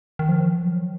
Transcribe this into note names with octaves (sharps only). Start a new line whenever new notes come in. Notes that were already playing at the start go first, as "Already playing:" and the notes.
D#3
F3
F#3